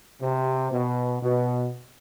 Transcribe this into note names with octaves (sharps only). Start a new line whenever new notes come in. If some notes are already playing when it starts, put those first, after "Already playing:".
C3
B2
B2